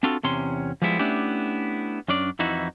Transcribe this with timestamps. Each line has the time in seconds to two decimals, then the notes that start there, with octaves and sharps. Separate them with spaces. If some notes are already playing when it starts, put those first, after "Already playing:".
0.03 C4 D4 F4 F#4 A4
0.23 E2 C3 C#4 C6
0.82 F3 G3 G#3 B3 E4
0.99 A3 B3 C#4 D4 E4 G4
2.08 F#2 C#4 D4 D5
2.39 F2 E3 D#4 E4 F#4